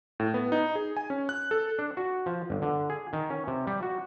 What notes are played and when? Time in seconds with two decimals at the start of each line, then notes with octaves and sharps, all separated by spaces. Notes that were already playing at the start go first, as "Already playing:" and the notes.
0.20 A2
0.34 B3
0.52 D#4
0.75 G#4
0.97 G#5
1.10 C#4
1.29 F#6
1.51 A4
1.79 D4
1.97 F#4
2.26 F3
2.50 G1
2.62 D3
2.90 G#4
3.13 D#3
3.30 C#4
3.47 C3
3.67 G3
3.83 F#4